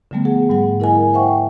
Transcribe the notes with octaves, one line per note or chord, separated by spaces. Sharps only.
D3 F3 G3 A3 B3
G#4 F#5
G#2 G3 F#5
E4 A#4 D#5 G#5
C5 E5 F#5 G5 C#6